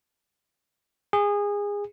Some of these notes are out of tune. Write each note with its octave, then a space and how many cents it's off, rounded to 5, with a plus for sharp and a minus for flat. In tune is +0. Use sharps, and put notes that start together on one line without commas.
G#4 -25